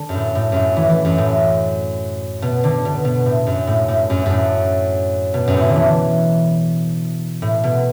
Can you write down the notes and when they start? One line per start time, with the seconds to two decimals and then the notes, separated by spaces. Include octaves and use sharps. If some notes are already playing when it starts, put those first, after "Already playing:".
Already playing: D3
0.09 F#2
0.14 A2
0.35 A2
0.52 F#2 A2
0.77 E3
0.90 E3
1.05 F#2
1.18 A2
2.42 B2
2.64 D3
2.85 B2
3.05 B2
3.26 A2
3.46 F#2
3.67 A2
3.88 A2
4.10 F#2
4.26 F#2 A2
5.34 B2
5.48 F#2
5.54 A2
5.62 B2
5.69 D3
5.76 E3
7.42 A2
7.64 B2